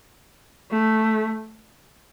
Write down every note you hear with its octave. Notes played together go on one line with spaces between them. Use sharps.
A3